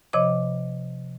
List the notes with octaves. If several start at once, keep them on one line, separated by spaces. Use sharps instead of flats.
C3 F3 C#5 D#5 D6